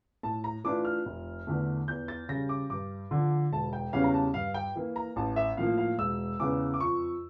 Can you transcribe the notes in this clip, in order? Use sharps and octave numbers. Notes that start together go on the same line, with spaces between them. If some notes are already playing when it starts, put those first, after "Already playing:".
A2 A5
A#5
E3 A3 D4 F4 D6
F6
F1
E2 D3 A3
E2 G6
A6
C#3 G3 A#6
D6
G2 D6
D3 F3
E1 A5
G5
E2 C#3 G3 C#4 F5
A#5
A5
G2 F5
G5
E3 A#3
A#5
A1 A5
E5
A2 F3 A#3 F5
F5
E1 E6
E2 C#3 E3 D6
D6
F2 C#6